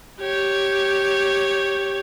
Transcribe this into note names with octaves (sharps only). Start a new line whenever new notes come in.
G4 C#5